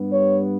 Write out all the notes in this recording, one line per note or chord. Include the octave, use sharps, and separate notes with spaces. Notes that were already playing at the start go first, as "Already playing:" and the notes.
Already playing: G2 G3 B3
C#5